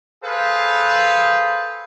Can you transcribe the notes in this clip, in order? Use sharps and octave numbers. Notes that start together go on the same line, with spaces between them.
G#4 A4 B4 C5 F5